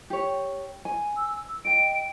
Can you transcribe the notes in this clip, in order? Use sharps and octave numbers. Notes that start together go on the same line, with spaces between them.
G4 C#5
G#5
E6
D#5 G5 D7